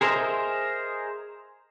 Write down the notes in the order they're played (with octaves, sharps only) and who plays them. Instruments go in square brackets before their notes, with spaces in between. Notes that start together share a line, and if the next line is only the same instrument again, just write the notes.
[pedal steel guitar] G#4 A#4 C5 D#5 E5